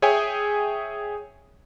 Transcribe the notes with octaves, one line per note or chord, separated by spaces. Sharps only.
G#4 C#5 E5 G5 G#5